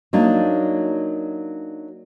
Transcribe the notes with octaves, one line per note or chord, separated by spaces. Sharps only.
F#3 A#3 D4 D#4